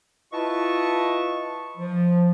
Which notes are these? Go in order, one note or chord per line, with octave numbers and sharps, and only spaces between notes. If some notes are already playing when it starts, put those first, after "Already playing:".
E4 F4 B4 D#5 A5 C#6
F3